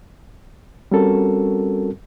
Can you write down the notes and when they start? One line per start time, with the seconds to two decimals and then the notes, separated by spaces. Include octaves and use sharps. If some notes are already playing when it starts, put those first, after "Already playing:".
0.91 G3 C4 C#4 F#4 A4 A#4